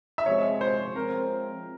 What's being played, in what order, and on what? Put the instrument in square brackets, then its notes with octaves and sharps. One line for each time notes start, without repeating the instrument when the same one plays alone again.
[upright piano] E5
[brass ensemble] C3 F3 G#3 C4 [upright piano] C#5
[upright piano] C5
[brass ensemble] F3 G#3 C4 [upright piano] A#4